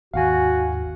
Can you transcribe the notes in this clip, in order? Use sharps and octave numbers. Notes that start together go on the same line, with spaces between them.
G#1 D#2 F#4 F5 F#5 G#5